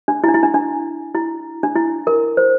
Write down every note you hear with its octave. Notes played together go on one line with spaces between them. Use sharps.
D4
E4
D4
E4
D4
D4
E4
D4
E4
A#4
C5